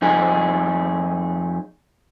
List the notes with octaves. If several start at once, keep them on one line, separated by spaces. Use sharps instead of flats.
F2 D#4 G#4